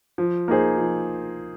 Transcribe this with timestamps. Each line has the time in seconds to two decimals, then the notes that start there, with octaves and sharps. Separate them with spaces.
0.18 F3
0.48 A#3 D#4 G#4 C5
0.78 F3